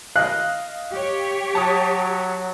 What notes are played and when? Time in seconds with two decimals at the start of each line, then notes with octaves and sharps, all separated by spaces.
0.16 D#5 F5 F#6
0.92 G4 C#5
1.55 F#3 A5 D#6